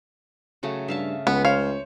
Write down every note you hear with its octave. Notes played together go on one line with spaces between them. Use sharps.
C#3 F#3 A3
G2 E5 F5 A5
C#2 A3 B3 B5
C5 C#5 F5